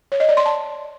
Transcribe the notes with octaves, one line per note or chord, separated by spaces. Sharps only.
C#5
D#5
D5
C6
A5